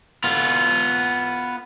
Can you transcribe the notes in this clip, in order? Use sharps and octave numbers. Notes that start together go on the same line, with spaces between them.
B3 F4